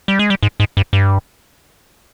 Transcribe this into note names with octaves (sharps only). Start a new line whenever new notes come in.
G3
G#3
G3
G#2
G#2
G2
G2